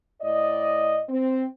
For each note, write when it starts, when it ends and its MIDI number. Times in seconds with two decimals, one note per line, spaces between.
0.21 1.01 45
0.21 1.01 74
0.21 1.01 75
1.08 1.43 60